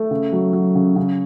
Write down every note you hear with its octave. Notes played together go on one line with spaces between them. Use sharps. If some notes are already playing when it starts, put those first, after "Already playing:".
Already playing: A3
C#3
F#3
F#3
C#3
C#3